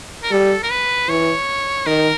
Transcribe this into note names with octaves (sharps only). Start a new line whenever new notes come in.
A#4
G3 A4
A#4
B4
E3 C#5
D#3 A#4